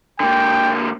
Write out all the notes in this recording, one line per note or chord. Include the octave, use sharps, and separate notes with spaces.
D3 A#3 G5